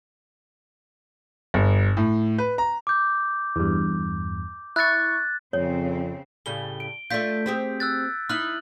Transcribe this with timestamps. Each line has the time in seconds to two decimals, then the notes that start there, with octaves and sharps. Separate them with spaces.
1.54 G1
1.97 A2
2.38 B4
2.58 A#5
2.87 D6 G6
3.56 E2 G2
4.76 E4 C#6 F#6 A6
5.53 F2 C#3 C4 C#5
6.46 A2 C#3 G3 G7
6.80 D7
7.10 A3 D4 F4 G6 B6
7.46 C4 G4 G#4
7.80 E6 F#6 A6
8.29 D#4 E4 F6 F#6 F#7